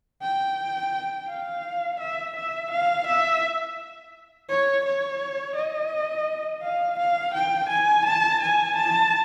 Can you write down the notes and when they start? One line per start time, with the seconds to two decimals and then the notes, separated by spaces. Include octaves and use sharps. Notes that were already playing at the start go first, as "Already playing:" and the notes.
0.22 G5
1.28 F5
2.00 E5
2.36 E5
2.71 F5
3.07 E5
4.49 C#5
4.85 C#5
5.56 D#5
6.62 F5
6.99 F5
7.34 G5
7.69 G#5
8.05 A5
8.41 G#5
8.76 A5